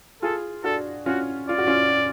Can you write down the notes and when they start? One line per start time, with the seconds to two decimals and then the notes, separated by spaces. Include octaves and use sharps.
0.22 F4 G#4 A4
0.64 D4 F#4 A4
1.06 C#4 F4 F#4
1.49 F4 D5
1.58 F#4
1.67 C#4 F4